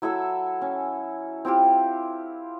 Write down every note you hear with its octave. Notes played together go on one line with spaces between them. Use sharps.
F#3 E4 A4 E5
C#4
C4 E4 F4 G4